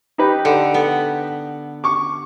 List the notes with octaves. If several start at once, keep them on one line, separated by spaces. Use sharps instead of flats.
D#4 G4 B4
D3
B3
C#6 D6